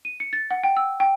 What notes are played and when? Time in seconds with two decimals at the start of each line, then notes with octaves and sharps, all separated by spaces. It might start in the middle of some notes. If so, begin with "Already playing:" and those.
0.05 D#7
0.20 C#7
0.33 A6
0.51 F#5
0.64 G5
0.77 E6
1.00 G5